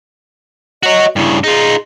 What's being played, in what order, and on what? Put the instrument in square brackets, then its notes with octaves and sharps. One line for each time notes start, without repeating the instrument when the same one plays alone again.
[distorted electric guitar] F#4 C#5 [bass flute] D#5
[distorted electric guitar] G2 C#3 [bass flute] E4
[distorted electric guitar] D#4 F4 [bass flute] G#4